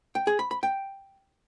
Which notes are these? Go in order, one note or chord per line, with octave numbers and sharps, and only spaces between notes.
G5
G#4
B5
B5
G5